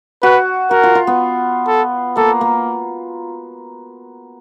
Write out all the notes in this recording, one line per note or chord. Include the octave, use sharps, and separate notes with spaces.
F#4 B4
F#4 A#4
F4
F4
B3
A4
A#3 A4
A#3